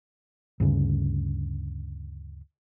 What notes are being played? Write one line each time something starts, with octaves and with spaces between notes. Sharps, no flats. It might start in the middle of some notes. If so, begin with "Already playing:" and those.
D2 G2 C#3